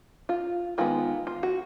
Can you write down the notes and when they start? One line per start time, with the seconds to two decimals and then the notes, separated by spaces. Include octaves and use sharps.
0.29 F4
0.78 D#3 G#3 B3 F4
1.27 F4
1.43 F#4